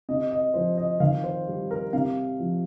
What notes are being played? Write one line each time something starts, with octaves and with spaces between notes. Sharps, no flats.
C3 D#5
D#5
F3 C5
D#5
D#3 F5
C5
G3
A#4
C3 F5
F3